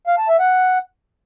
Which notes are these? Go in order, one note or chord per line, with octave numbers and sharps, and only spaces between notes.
F5
A5
E5
F#5